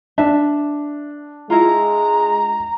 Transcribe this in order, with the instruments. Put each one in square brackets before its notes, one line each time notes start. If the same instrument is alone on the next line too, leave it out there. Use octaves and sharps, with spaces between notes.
[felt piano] D4 [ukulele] E5 A5
[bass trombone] G#3 [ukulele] E4 F4 [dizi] A#5